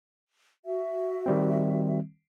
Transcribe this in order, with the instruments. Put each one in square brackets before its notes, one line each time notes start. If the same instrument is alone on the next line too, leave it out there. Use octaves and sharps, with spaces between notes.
[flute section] F#4 E5
[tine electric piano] D#3 G3 C4